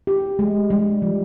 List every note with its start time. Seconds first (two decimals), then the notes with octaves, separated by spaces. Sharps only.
0.07 G4
0.39 G#3
0.70 G3
1.02 F3